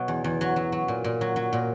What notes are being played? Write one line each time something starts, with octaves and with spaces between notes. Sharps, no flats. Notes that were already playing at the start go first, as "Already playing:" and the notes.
Already playing: B2 F#3
E2
E2
F#3
F#3
F#3
A#2
A#2
F#3
F#3
A#2